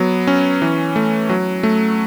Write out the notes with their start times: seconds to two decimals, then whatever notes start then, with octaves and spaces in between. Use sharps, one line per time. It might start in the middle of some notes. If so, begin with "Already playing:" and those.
Already playing: F#3 B3
0.27 C#4
0.62 E3
0.96 A3
1.30 F#3
1.63 A3